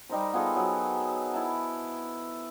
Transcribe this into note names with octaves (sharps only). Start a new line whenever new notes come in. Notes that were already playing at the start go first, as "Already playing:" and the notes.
G3 D#4 A#4 C5
B3 F4 G#4 A4
F#3
E4 A5